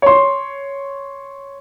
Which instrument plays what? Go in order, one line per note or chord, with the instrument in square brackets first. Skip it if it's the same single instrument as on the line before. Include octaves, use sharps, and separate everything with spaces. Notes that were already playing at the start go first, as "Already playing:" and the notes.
[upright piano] C#5 C6